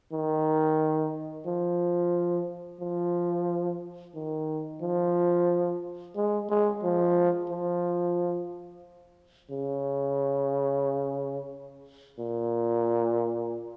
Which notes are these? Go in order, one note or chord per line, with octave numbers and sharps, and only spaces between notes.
D#3
F3
F3
D#3
F3
G#3
G#3
F3
F3
C#3
A#2